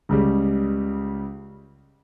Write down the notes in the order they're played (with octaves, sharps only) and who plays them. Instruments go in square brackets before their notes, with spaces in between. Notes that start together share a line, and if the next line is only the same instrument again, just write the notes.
[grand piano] C#2 C#3 G3